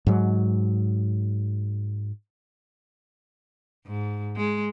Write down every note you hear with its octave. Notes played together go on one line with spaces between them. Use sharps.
G#2 F#3
G#2
G#3